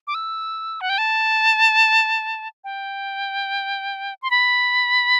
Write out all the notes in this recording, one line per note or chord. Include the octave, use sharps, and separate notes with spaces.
D6
E6
F#5
G5
A5
G5
C6
B5